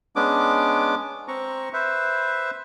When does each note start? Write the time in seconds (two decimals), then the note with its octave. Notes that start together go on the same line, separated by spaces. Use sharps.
0.16 G#3 B3 C#4 D4 D6
1.28 C4 A#5 C#6
1.73 B4 C5 E5